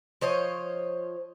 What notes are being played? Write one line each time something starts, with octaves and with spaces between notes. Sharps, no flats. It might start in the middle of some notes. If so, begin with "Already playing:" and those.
F3 C5 C#5 D#5